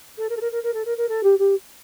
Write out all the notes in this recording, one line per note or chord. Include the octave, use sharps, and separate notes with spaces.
A4
A#4
A4
A#4
A#4
A#4
A4
A#4
A#4
A4
G4
G4